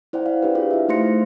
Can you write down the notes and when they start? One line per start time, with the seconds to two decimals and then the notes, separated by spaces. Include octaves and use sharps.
0.13 E4 C5 D5 F#5 G5
0.26 F5
0.42 D4 G4 B4
0.55 F4 G#4 F5
0.71 E4 E5
0.89 A3 D#4 C5 C6 A#6 C#7